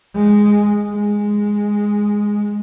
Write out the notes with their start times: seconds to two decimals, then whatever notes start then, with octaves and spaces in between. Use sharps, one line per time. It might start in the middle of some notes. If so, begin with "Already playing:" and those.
0.15 G#3
0.92 G#3